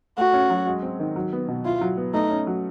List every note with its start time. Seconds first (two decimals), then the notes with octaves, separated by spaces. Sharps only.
0.18 A3 F#4
0.33 C#4
0.50 F#3
0.67 G#3
0.83 C4
1.00 D#3
1.16 F#3
1.33 B3
1.48 B2
1.65 E4 F4
1.81 F#3
1.97 B3
2.13 A3 D#4
2.30 C#4
2.47 F#3